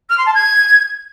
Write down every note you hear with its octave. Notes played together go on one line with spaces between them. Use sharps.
F6
C6
A5
G#6